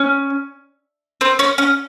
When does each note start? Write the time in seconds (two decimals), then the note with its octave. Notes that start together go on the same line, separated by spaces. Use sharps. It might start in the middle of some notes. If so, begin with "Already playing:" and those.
Already playing: C#4
1.21 C4
1.39 C#4
1.58 C#4